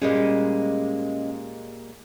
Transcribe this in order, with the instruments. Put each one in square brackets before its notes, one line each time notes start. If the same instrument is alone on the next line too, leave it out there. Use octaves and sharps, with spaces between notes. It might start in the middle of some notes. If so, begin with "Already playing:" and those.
[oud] A#2 G3 G#3 [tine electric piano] C#4 D#5